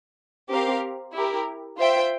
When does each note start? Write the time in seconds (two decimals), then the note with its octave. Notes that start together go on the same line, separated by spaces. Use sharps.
0.52 C4 G4 A#4 F5
1.15 E4 G4 A#4
1.78 F4 C5 E5 G5